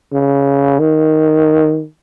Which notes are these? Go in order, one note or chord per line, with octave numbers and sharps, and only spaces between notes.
C#3
D#3